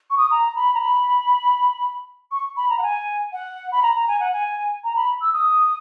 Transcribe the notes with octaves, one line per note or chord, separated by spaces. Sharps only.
C#6
D#6
A#5
B5
A#5
B5
C#6
B5
A#5
F#5
G#5
F#5
B5
A#5
A#5
G#5
F#5
G#5
A#5
B5
E6
D#6